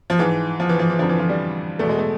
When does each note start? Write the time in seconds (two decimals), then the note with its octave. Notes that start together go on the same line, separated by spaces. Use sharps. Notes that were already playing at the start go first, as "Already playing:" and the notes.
0.10 F3
0.19 G#2 E3
0.60 F3
0.69 E3
0.79 F3
0.89 E3
0.99 F2 D3 F3
1.09 E3
1.19 F3
1.29 G3
1.79 E2 B2 A3
1.89 G#3
1.99 A3